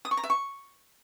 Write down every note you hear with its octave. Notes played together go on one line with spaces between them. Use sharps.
D#6
C#6
A#5
E5
C#6